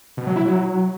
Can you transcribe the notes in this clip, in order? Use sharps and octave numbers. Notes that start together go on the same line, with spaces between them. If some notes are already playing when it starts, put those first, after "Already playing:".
B2
F#3
E4
F#3